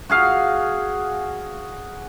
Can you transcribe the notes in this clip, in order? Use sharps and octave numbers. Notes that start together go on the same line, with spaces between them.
F#4 G#4 F5